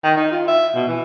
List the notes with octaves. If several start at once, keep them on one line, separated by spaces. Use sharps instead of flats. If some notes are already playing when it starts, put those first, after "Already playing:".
D#3
D#4
F4
E5
B2
E3